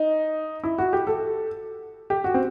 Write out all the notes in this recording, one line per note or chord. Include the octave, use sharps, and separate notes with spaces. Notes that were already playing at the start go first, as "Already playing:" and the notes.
Already playing: D#4
E4
F#4
G4
A4
G4
F#4
C4